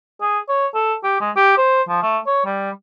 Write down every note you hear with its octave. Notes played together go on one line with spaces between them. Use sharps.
G#4
C#5
A4
G4
G#3
G4
C5
F3
A3
C#5
G3